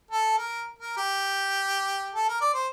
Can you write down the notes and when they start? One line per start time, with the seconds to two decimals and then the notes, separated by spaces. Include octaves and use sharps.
0.11 A4
0.37 A#4
0.79 A#4
0.97 G4
2.15 A4
2.28 A#4
2.41 D5
2.54 C5